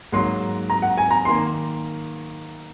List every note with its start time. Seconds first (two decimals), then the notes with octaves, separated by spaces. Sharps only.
0.12 G#2 F#3 A#3 C6
0.70 A#5
0.82 F#5
0.97 G#5
1.11 A#5
1.25 D#3 A#3 C6